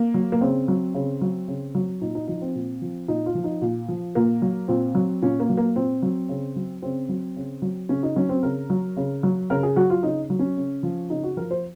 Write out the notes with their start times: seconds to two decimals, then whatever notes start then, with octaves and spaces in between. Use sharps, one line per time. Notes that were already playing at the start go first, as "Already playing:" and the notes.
Already playing: A#3
0.14 F#3
0.32 A#3
0.41 C#3 C4
0.68 F#3
0.94 C#3
1.21 F#3
1.48 C#3
1.75 F#3
2.01 A#2 D#4
2.15 D#4
2.28 F3 D#4
2.41 C4
2.55 A#2
2.82 F3
3.08 A#2 D#4
3.26 F4
3.35 F3
3.44 D#4
3.61 A#2
3.88 F3
4.15 A#2 A#3
4.42 F#3
4.68 A#2 C4
4.95 F#3
5.22 A#2 C#4
5.40 A#3
5.49 F#3
5.57 A#3
5.76 A#2 C4
6.03 F#3
6.29 C#3
6.56 F#3
6.82 C#3 C4
7.09 F#3
7.36 C#3
7.62 F#3
7.89 C#3 C#4
8.03 D#4
8.16 F#3 C#4
8.29 C4
8.43 C#3 A#4
8.70 F#3
8.97 C#3
9.23 F#3
9.50 C#3 A#4
9.63 G#4
9.76 F#3 F#4
9.90 F4
10.03 C#3 D#4
10.30 F#3
10.39 C#4
10.57 C#3
10.83 F3
11.10 C#3 D#4
11.23 F#4
11.37 F3 A#4
11.51 C5